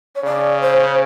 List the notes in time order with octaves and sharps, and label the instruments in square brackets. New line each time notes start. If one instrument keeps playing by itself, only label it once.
[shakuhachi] C#5
[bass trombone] C#3 [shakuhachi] D5
[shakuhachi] C5